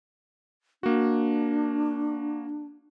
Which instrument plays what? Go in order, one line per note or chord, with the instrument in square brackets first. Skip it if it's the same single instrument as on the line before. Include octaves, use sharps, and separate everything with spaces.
[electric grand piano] A#3 F#4 [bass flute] D4